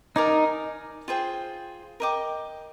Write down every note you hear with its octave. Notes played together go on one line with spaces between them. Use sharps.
D#4 A#4 D5 G#5
F4 G#4 C5 G5
A#4 D#5 G5 D6